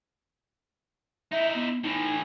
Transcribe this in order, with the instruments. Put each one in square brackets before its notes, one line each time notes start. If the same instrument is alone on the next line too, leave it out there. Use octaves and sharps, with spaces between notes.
[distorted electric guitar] D#4 E4 [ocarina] E5
[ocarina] B3
[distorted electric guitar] A2 E3 [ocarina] D#4